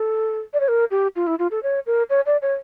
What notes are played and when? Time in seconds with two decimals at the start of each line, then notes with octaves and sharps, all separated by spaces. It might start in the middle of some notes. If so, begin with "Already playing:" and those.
Already playing: A4
0.53 D5
0.60 C#5
0.68 A#4
0.91 G4
1.16 F4
1.27 E4
1.39 F4
1.51 A4
1.63 C#5
1.86 A#4
2.10 C#5
2.26 D5
2.42 C#5